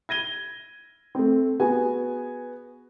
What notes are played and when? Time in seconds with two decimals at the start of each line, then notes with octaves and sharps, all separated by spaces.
0.09 G#6 A#6 D#7 G7
1.15 A3 C4
1.60 B3 F#4 G#4 G#5